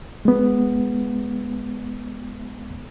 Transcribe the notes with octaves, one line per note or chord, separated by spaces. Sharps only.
G#3 B3